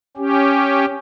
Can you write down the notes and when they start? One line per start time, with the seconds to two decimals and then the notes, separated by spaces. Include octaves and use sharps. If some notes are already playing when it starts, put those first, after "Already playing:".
0.17 C#4 G4